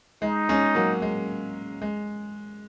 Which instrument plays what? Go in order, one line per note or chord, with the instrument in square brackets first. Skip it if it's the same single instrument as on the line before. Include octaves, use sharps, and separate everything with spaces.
[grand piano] G#3 [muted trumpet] D#4
[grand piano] G#3 C#4
F#3 A#3
G#3
G#3